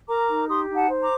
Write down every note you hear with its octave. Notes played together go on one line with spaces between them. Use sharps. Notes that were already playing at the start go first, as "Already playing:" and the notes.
A#4 A#5 D6
D#4
G4 C6 D#6
D#4
F#5 A5
C5
A#5 D6